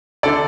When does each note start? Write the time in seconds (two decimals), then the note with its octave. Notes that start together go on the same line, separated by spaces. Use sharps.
0.23 D3 A4 D5